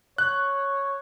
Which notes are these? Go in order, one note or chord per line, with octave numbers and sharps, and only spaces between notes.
C#5 F#6